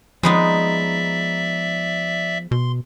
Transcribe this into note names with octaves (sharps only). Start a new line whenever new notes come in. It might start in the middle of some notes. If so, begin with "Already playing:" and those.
F3 G#3 B3 D#4 D5 E5
B2 C6